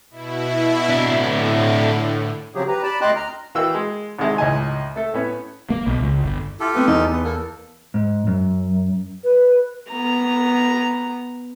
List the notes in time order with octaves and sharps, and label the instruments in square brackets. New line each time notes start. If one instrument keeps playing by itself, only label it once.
[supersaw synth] B2 E4
[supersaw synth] A2 D3 [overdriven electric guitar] D4 E4
[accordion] C#3 F3 F#3 C4 G4 G#4
G4 B4 A#5
D5 A5 B5
D2 D#5 G5 C6 D6 F#6
A#5 F6
[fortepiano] E3 A#3 F#4 F5 G5 E6
G#3
G#1 C3 G#3 E4
C#2 A2 D#5 G#5
A3 A4
A2 B3 C#4
[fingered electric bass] A#3
B1
C#2
G1
[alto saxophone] E4 [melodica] F4 G4 A4
[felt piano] A3 C4 [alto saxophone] B3
[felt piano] E2 [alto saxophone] D#4
[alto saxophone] B3
[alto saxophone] A#3 [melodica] A4
[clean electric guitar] G#2
F#2
[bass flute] B4
[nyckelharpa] B3 A#5